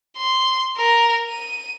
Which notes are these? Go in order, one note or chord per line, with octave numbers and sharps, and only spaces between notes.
C6
A#4
D#7